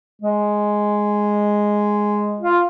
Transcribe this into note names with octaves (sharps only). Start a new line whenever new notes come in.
G#3
F4